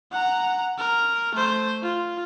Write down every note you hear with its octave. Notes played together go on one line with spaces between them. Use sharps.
F#5 A#5
A#4
A3 C5
F4